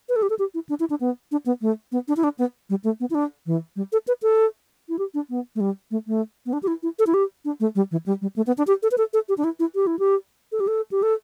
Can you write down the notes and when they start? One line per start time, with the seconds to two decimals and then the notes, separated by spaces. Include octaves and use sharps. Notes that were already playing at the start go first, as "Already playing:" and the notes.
0.09 B4
0.16 A4
0.22 G4
0.30 A4
0.39 G4
0.54 E4
0.69 D4
0.80 E4
0.90 D4
1.00 B3
1.32 D4
1.46 B3
1.61 A3
1.92 B3
2.08 D4
2.17 E4
2.24 D4
2.39 B3
2.70 G3
2.84 A3
3.00 B3
3.10 E4
3.15 D4
3.46 E3
3.76 G3
3.93 A4
4.08 B4
4.23 A4
4.89 E4
4.99 G4
5.14 D4
5.30 B3
5.55 A3
5.60 G3
5.91 A3
6.07 A3
6.46 B3
6.53 D4
6.63 G4
6.67 E4
6.83 E4
6.99 A4
7.07 E4
7.14 G4
7.45 D4
7.60 A3
7.75 G3
7.91 E3
8.06 G3
8.22 G3
8.36 A3
8.47 B3
8.58 D4
8.67 G4
8.83 A4
8.91 B4
8.98 A4
9.13 A4
9.29 G4
9.38 D4
9.44 E4
9.59 E4
9.75 G4
9.87 E4
9.99 G4
10.52 A4
10.60 G4
10.68 A4
10.91 G4
11.03 A4